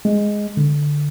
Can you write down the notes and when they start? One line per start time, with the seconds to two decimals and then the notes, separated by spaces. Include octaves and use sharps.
0.05 G#3
0.57 D3